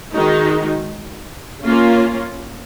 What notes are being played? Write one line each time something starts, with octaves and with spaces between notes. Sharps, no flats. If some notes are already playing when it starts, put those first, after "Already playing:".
D#3 G#3 D#4 F#4
A#3 C#4 F4